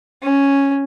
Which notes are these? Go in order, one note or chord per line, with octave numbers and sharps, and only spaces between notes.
C#4